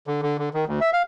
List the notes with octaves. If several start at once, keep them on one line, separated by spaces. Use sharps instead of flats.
D3
D3
D3
D#3
D2
E5
F5